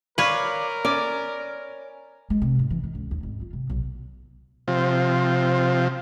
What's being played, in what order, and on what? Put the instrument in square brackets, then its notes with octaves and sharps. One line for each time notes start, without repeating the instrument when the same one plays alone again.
[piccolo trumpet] A#4 [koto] B4 C#5 [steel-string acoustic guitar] D5 F5
[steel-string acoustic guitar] C#4 [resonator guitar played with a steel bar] D5
[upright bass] G#3
C3
G#2
E3
D#3
C#2
D#2
G#1
F4
C3
B1
[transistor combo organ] C3 F3